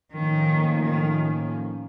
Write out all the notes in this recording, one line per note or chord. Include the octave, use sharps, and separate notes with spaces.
A2 D#3 F3 A#3 C#4
D#3